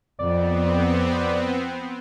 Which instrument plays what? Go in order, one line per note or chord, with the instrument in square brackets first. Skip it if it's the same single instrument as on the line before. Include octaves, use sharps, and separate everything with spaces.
[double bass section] F2 [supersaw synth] B3 C4 [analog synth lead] D5